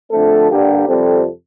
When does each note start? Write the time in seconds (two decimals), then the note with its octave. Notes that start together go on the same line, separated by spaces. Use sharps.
0.11 F2 D3 A3 C4 A4
0.49 G2 D3 G3 A#3 G4
0.87 F2 C3 G3 C4 A4